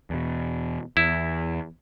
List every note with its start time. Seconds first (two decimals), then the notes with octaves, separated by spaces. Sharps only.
0.10 E2 B2
0.97 E2 E4